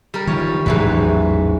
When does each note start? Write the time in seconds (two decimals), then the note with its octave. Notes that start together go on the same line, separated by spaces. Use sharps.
0.14 G3 A#4
0.27 D#3 F3 C#5
0.66 A1 E2 G#2 E3 F#3 B4